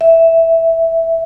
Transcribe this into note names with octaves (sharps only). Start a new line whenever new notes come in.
E5